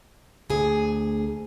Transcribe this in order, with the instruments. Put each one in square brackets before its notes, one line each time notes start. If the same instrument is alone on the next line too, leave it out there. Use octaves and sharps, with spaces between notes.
[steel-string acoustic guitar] D2 G#4